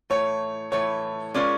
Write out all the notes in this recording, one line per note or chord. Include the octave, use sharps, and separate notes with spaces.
A2 E3 A3 C#5
A2 E3 A3 C#5
G#3 C#4 F4 A#4 C#5 D5